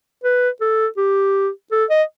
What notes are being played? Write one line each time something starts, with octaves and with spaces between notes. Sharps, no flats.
B4
A4
G4
A4
D#5